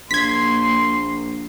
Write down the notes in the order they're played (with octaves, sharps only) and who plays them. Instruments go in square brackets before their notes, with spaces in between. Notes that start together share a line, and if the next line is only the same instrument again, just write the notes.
[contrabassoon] A#1 [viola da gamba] A#3 [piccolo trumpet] C6 [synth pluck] G#6 B6